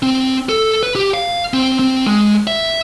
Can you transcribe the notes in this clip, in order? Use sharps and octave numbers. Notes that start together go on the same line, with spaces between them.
C4
A4
B4
G4
F5
C4
C4
G#3
E5